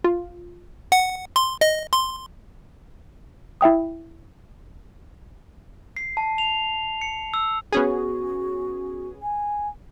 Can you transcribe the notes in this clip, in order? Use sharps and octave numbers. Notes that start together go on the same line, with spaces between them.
F4
F#5
C6
D#5
C6
E4 E5 G5 D#6
C7
A5
F7
C#7
E6
B3 C#4 F#4 G#4
G#5